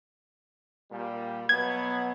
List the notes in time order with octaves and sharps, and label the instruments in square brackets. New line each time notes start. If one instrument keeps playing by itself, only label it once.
[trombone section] A#2 G3
[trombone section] B2 F#3 B3 [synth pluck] G#6